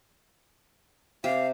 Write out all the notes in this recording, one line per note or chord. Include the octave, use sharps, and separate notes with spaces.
C3 G4 F5